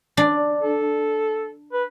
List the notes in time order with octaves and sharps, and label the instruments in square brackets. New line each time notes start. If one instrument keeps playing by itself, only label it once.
[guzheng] D4
[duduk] A4
B4